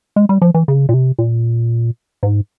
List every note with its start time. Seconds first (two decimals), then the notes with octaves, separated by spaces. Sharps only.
0.16 G#3
0.29 G3
0.41 F3
0.54 E3
0.68 C#3
0.89 A#2
0.94 C3
1.18 A#2
2.23 G#2